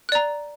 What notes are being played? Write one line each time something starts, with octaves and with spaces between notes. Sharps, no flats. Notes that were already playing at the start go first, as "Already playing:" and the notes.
D5 A#5 F#6